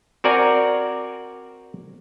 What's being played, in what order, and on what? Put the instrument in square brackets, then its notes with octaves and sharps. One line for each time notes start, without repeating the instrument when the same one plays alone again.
[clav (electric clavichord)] C4 F#4 A#4 D5 G#5 A#5